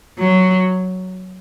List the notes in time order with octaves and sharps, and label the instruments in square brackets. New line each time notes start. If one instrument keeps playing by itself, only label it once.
[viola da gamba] F#3